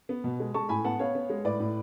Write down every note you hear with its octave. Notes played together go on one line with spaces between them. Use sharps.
B3
B2
G#3
G#3 A5 C#6
A2 G#5 B5
B3 F#5 A5
B3 C#5 F5
B3
G#3
A2 B4 D5
A2